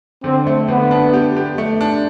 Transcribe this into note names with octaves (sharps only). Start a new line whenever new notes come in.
D3 C4
A3
D3 B3
D4
G4
G4
A3
D4